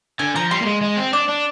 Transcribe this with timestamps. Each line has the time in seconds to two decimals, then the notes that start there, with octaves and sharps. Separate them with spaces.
0.19 D3 G#5
0.36 F3 A#5
0.51 G3 C6
0.62 A#3
0.66 G#3
0.82 G#3
0.97 C4
1.13 D4 D6
1.29 D4